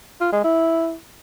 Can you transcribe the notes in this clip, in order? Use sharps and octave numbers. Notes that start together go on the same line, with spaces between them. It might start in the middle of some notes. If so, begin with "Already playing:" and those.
F4
G#3
E4